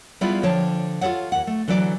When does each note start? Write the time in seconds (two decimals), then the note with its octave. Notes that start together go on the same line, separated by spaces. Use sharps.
0.21 G3 B3 E4 F4 G#4 D5
0.43 D3 F3 C#5 G5 A5
1.01 F4 G#4 A4 C#5 F#5
1.32 D#2 F#5
1.47 A3
1.68 D3 E3 F#3 E4 D5